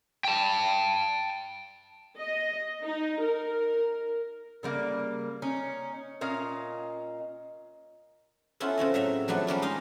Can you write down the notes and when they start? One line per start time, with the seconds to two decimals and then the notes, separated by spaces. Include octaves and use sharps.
0.24 G5 A5
2.18 D#5
2.85 D#4
3.23 A#4
4.63 C#3 G3 A#3
5.42 C#4 D#4
6.21 A#2 C#4 D#5 F5
8.60 B3 C#4 E4 F4 A4
8.78 C#3 C4 C#5 D#5
8.94 A2 F#3 E5 A#5
9.28 F3 F#3 A3 B3 D4
9.47 G3 A#3 C#4 D4
9.62 G#3 D#4 D#5 F5 C6